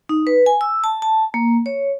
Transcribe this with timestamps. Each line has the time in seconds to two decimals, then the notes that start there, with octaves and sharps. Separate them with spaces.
0.09 D#4
0.27 B4
0.46 G#5
0.61 E6
0.84 A5
1.02 A5
1.34 A#3
1.66 C#5